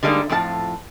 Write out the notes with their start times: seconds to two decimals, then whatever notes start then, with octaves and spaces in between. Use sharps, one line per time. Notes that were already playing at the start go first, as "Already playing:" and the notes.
0.03 D3 G3 G#3 A#3 D#4
0.30 F2 A2 F4 F#4 A5